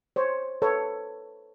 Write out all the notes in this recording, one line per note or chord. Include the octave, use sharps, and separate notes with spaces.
C5 C#5
A4 B4 C#5